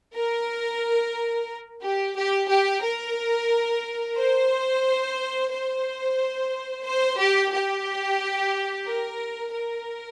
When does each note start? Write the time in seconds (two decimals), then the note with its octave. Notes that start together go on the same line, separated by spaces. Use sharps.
0.15 A#4
1.82 G4
2.16 G4
2.49 G4
2.83 A#4
4.18 C5
5.51 C5
6.85 C5
7.19 G4
7.52 G4
8.87 A#4
9.53 A#4